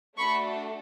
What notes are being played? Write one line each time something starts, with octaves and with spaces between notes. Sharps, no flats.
A3 D4 F#4 A4 B5 C#6